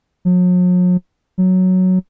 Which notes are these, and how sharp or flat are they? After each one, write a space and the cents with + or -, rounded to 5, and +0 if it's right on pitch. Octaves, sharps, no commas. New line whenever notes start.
F#3 -45
F#3 +0